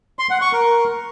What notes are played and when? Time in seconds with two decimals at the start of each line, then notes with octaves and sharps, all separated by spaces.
0.19 C6
0.30 F#5
0.42 C#6
0.53 A#4